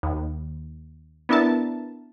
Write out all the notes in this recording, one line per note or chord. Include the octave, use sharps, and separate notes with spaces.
D#2
B3 D4 E4 A#4 E5 A5